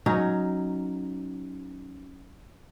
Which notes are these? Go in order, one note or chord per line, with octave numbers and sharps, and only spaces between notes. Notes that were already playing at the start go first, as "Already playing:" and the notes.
F#3 C#4 D#4